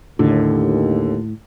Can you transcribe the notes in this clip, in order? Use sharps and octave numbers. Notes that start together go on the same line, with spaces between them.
D#2 A2 D3